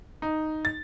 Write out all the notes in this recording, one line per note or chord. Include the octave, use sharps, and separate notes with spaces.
D#4
A6